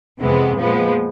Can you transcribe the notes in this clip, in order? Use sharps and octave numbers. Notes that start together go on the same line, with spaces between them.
F2 C3 E3 G#3 B3
A#2 F3 G#3 B3